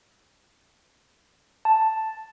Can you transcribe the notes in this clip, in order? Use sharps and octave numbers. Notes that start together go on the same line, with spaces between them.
A5